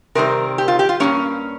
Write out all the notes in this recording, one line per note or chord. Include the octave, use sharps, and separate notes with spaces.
C3 D#3 G3 C4 A#4
G4
F4
G4
F4
G2 D#3 A#3 C#4